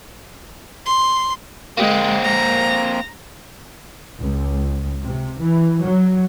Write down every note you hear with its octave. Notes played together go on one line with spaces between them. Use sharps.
C6
G#3 A#3 C4
A#5
C#2
C3
E3
F#3